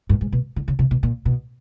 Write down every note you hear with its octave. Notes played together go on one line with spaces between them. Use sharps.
G2
G#2
B2
D3
C#3
C3
B2
A#2
B2